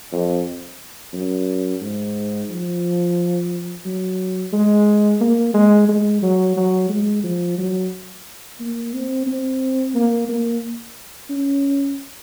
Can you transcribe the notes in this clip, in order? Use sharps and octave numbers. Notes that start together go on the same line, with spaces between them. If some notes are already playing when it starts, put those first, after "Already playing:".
F2
F#2
G#2
F3
F#3
G#3
A#3
G#3
G#3
F#3
F#3
G#3
F3
F#3
A#3
C4
C4
A#3
A#3
C#4